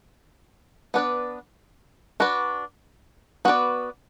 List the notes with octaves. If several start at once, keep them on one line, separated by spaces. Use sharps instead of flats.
B3 D4 B4 D5
D4 F#4 B4
B3 F#4 B4 D5